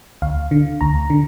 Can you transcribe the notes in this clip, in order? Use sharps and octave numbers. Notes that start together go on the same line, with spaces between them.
D2 F5
D3
D2 A#5
D3